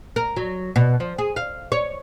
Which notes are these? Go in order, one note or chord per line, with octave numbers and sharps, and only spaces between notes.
A#4
F#3
B2
F3
G#4
F5
C#5